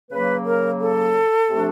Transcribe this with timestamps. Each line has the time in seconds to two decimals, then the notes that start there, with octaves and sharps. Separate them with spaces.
0.11 C#3 F#3 A#3 B4
0.46 A#4
0.81 A4
1.50 C3 F3 A3 D4